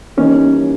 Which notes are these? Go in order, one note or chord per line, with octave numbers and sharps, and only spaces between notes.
E3 G3 A#3 C#4 D#4